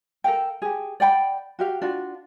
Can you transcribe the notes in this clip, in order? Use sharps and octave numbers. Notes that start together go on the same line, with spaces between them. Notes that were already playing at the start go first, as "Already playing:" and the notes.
A4 A#4 F5 G5
G4 G#4
D5 F#5 G5 B5
F#4 G4 F5
D4 F4 F#4